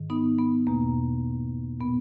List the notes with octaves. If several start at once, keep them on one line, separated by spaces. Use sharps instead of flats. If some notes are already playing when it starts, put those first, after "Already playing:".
Already playing: G#2 D#3
B3 D#4
B3
E2 B2 A#3
A#2 B3